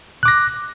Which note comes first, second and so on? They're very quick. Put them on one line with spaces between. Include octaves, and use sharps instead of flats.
F#6 D6 A#6